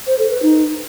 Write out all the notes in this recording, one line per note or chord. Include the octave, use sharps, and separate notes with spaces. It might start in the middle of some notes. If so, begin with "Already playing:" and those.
C5
A4
B4
D#4